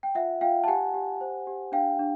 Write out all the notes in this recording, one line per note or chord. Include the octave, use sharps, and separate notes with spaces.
G5
F4 E5 F#5
F4 F5 G5
A5
G4 F#5 G#5
G4
C5
G4
D4 F5 G5
D4